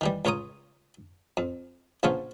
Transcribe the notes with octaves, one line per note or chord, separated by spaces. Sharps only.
D#3 E3 G3
C#2 F4 C#5 A#5 D#6
F2
A#1 C#3 F3 B3 F4 C#5